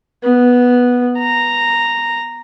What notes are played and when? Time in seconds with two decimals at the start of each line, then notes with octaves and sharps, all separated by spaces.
0.24 B3
1.18 A#5